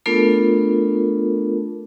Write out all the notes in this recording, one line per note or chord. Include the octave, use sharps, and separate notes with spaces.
A3 B3 D4 F4 A4 A#4